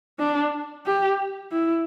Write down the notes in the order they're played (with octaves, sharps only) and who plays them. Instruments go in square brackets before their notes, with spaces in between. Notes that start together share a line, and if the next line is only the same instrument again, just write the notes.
[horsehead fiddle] D4
G4
E4